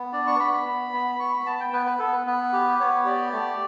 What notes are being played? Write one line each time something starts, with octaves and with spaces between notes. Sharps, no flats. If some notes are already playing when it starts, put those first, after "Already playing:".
Already playing: B3
D4 D5
C#6
B3 B5
B5
B3
B3
B5
B3 C#6
B5
B3 A5
G5
B3 B4
B4
B3 A4
B4
B3 B4
G4
B3 C#5
G4 D5
A3